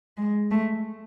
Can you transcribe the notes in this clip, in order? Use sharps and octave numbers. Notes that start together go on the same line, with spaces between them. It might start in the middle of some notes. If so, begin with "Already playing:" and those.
G#3
A3